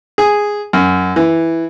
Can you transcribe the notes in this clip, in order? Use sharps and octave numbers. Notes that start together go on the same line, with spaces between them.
G#4
F#2
E3